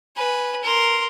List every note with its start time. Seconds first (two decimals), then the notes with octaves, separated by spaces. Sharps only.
0.17 B4 G#5
0.63 A#4 C6